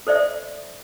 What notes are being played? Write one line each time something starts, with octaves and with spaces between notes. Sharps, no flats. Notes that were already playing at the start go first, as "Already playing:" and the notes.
A4 C5 D5 E5